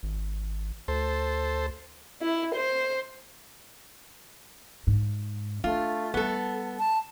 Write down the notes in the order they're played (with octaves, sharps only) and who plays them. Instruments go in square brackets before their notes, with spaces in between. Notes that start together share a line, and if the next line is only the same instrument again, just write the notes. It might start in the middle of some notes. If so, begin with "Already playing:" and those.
[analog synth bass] G#1
[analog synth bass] D2 [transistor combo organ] A4 C5
[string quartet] E4
C5
[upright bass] G#2
[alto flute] A3 [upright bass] D4 [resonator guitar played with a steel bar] F4
[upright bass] G3 [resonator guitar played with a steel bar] B3 A4
[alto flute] A5